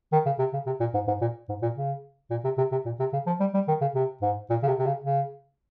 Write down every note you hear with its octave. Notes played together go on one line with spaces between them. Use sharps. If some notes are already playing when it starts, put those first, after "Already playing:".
D#3
C#3
C3
C#3
C3
A#2
G#2
G#2
A#2
G#2
A#2
C#3
A#2
C3
C3
C3
A#2
C3
C#3
F3
G3
G3
D#3
C#3
C3
G#2
A#2
C#3
C3
C3
C#3
C#3